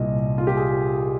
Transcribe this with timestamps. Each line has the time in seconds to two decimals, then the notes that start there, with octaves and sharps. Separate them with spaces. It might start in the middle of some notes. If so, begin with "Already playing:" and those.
Already playing: C2 A#2 G3 D#5
0.38 F4
0.47 G4
0.57 G#4